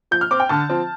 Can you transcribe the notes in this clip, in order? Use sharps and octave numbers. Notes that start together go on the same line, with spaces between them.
F3 G6
F6
C4 D6
G5
D3 A5
F3 C4